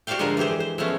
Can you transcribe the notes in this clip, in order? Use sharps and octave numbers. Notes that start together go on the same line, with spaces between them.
F#4 G4 C5 D5 F5 G5
D3 F3 G#3 F4 A#4
E3 G#3 G4 G#4 C5
C5
F3 G#3 A3 B3 C#4